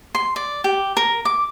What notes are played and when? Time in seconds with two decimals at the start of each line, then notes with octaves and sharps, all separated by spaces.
0.15 C6
0.36 D5
0.64 G4
0.97 A#4
1.25 D6